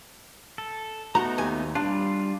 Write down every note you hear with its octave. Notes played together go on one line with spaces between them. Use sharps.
A4
A3 B3 D#4 F#4 A#5
D#2 G#5
G3 D4 F4